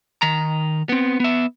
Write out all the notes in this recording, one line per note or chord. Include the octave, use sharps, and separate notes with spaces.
D#3 A#5
B3 C4
B3 E5